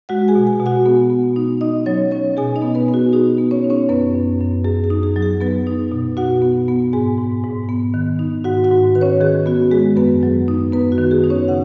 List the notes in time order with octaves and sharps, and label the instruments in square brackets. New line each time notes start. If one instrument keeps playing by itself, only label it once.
[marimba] G#3 F#4 F#5
G#4 G#5
B2
G#4 G#5
B2
F#4 F#5
B3
B3
D#4
D#4 D#5
F#3 C#4 C#5
F#3 C#4 C#5
B2 G#4 G#5
D#4 D#5
B3
B3 B4
B3
F#4
D#4 G#4
B3
C#4 C#5
D#4
C#4 C#5
F#2 B3 B4
F#2
F#2
F#2 G#4
G#4
D#4
G#4
F#3
G#4
F#3 B3 B4
D#4
B2
B2 F#4 F#5
B3
B3
G#2 G#4 G#5
G#2
G#2
B3
D#3
D#4
G#2 F#4 F#5
F#4 F#5
G#2
D#3 B4
C#4 C#5
D#3 G#4
B3 F#4
G#3 G#4
F#2 B3 B4
F#3
D#4
F#2 B3 B4
F#4
D#3
G#4
D#4
C#4 C#5
C#3 F#5